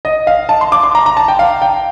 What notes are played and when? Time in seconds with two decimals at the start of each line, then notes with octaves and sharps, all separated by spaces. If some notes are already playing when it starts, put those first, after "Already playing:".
0.05 D#5
0.27 F5
0.49 A5
0.61 C6
0.72 D6
0.83 C6
0.95 A#5
1.06 A#5
1.17 A5
1.28 G5
1.39 F5
1.62 G5